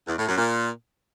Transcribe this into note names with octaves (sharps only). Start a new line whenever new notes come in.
E2
A2
F#2
A#2